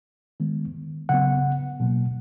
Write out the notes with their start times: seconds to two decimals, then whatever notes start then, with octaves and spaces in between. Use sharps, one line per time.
0.40 D#3 G#3 B3
1.09 C#3 F#3 B3 F#5
1.80 B2 F#3 A#3